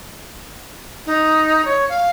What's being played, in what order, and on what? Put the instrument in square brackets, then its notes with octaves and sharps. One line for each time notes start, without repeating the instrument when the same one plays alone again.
[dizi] D#4
C#5
F5